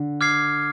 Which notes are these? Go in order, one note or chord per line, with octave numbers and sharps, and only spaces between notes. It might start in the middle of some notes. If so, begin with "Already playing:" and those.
Already playing: D3
D6 F6 G#6 C7